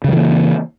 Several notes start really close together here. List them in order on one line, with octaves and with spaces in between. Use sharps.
C#3 F#3 E3 A#3